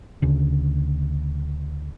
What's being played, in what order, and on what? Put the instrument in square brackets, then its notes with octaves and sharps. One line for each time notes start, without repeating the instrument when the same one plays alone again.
[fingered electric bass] D2 C#3